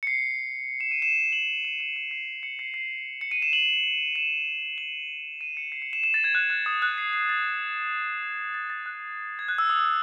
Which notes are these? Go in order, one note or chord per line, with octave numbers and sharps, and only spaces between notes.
C#7
C7
E7
D#7
E7
F#7
E7
E7
D#7
C7
C#7
C7
C7
C#7
D#7
E7
F#7
E7
F#7
D#7
C#7
C7
C#7
E7
E7
A6
G#6
F#6
F#6
D#6
F#6
C7
C7
A6
G#6
A6
A6
F#6
G#6
F#6
E6
D#6
D#6